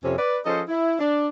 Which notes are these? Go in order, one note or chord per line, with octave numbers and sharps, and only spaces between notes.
F2 C3 C#4
B4 D5
F3 C#4 G#4 A4 C5 D#5
E4
D4